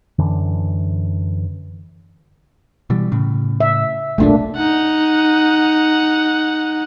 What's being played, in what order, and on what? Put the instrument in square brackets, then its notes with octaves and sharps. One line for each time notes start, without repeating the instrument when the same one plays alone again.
[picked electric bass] F#2 D3 E3
B2 E3 G3
A2 C#3
[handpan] E5
[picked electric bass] F1 B1 A#2 [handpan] A3 A#3 D4
[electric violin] D#4 F#5